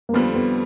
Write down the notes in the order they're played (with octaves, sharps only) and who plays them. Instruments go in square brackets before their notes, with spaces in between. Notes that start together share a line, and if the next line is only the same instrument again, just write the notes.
[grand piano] A#3
[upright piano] F2 D3 G3 C4 F4 [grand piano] B3
[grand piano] B3